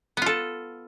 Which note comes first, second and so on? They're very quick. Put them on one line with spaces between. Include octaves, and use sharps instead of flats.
B3 F4 A4